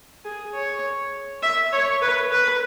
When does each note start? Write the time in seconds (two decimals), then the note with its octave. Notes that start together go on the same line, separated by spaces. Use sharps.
0.25 G#4
0.54 C#5
1.43 E5
1.72 C#5
2.01 B4
2.31 B4